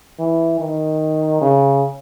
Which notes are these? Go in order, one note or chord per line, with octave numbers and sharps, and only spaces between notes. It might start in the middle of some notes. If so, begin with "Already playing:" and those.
E3
D#3
C#3